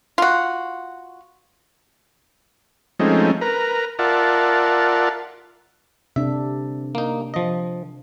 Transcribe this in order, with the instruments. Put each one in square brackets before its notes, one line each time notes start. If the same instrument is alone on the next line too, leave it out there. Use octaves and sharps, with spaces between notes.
[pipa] F4 F#4
[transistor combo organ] F3 G#3 A3 C4 C#4 D#4
A#4 B4 A#5
F4 A#4 D5 E5 F#5 A5
[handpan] C3 D4 [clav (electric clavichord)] E5
[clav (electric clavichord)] A#3 D#4
F3 D#5